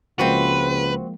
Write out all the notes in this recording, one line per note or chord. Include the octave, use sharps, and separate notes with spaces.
C#2 F3 G#3 A#3 C4 F#4 B4